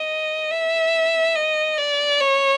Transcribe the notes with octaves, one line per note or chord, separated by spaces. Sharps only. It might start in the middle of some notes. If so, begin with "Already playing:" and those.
Already playing: D#5
E5
D#5
D5
C#5